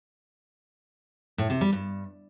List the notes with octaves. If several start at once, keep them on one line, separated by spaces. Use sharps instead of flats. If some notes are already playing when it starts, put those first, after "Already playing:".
A2
C3
G3
G2